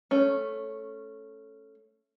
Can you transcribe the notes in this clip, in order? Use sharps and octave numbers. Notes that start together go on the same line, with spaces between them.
A3 C#4